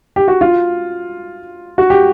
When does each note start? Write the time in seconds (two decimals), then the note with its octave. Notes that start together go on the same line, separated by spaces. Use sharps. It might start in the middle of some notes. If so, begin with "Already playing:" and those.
0.16 G4
0.28 F#4
0.41 F4
1.78 F#4
1.90 G4